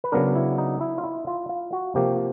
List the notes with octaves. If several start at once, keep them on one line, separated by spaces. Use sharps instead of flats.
B4
C#3 F#3 B3 D4 A#4
E4
D#4
E4
F4
E4
F4
F4
F#4
C3 F3 A#3 G4